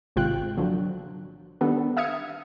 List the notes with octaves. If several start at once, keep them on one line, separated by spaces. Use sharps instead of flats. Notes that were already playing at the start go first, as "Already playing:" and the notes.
G#1 C3 G#3 F4 G5 F#6
D3 F3 F#3
D#3 G3 B3 D4 A4
E5 F5 D#6 F6 G#6 C#7